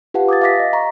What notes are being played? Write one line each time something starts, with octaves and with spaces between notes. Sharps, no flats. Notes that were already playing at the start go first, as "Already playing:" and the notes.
F4 G4 B4 F5 F#5 A5
D6 D#6 G#6 A6
E5 F5 G#5 D6 A#6 B6
D#5
D#5 A#5 C#6